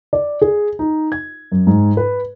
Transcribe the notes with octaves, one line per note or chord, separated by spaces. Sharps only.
D5
G#4
D#4
G#6
F#2
G#2
B4